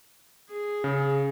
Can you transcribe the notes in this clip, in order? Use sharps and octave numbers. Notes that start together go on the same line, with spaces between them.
G#4
C#3